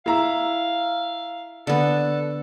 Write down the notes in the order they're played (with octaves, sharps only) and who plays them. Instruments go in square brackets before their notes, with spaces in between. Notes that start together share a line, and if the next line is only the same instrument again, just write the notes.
[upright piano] E4 A#5 E6 [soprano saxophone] F5
[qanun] D3 B3 [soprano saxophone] A4